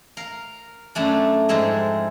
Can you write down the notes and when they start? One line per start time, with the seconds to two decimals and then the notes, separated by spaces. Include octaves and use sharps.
0.17 A#4 F5
0.95 F#2 A3 D4
1.49 F2 G#2 G#3 E5